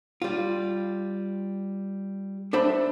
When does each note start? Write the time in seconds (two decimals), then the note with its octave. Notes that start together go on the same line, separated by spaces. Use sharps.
0.22 G3 F4
2.53 D4 A4 C5 E5 A5 B5